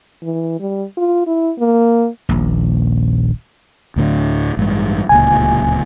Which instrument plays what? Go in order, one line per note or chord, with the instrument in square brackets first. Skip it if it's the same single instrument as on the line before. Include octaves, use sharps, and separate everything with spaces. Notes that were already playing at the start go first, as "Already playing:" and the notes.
[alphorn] E3
G3
F4
E4
A#3
[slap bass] D#1 A#1
[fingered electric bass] D2 A2 D3
A1 G2 G#3
[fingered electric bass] D1 C#2 A#2 [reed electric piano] G#5